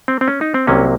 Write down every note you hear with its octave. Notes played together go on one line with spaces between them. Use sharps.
C4
C4
C#4
D#4
C4
C2 C3 F#3 A#3 C#4